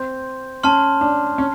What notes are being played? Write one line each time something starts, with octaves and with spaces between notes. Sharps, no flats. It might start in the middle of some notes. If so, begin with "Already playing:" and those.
Already playing: C4 C6 G6
C#4 A5 C6 F6
D4
C#4